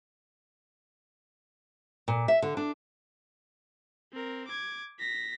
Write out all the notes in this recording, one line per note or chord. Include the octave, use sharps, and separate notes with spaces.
A#2
E5
D3
D4
C4 A#4
D6 G#6
A#6 B6